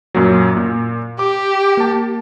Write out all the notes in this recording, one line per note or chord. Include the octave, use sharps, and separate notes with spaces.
F#2 A#2 F#3
A#2
G4 D6
A#3 A5